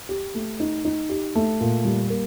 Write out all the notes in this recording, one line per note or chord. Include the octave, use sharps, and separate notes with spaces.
G4
A3
D#4
D#4
G4
A3
A#2
G3
A#3